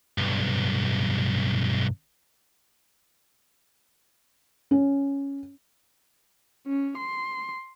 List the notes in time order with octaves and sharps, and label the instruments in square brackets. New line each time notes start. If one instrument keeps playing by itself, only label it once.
[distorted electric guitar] B1 G2
[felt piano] C#4
[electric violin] C#4
C6